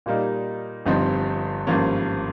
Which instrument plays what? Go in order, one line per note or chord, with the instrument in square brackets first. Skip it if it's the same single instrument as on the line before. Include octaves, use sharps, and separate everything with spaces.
[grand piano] A#2 G3 A#3 D#4
G1 G2 F3 C4 D#4
G#1 G2 F3 A#3 C#4